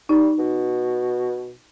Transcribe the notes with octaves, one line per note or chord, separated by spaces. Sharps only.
G3 D#4
B2